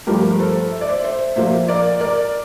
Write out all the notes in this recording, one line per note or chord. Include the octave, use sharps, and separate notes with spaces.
G2 F3 A3 G4 A#4
A#4
A4 C5
E5
D5
C5 E5
C5 E5
A#2 F3 A#3 C5 E5
A#4 D5
A#4 D5